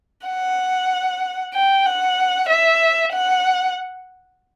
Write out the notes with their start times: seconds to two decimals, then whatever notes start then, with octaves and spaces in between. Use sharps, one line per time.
0.27 F#5
1.54 G5
1.86 F#5
2.49 E5
3.12 F#5